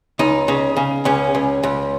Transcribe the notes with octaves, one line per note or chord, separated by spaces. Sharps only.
C#2 D#4
C#3
C#3
C#2 C#4
C#2
C#2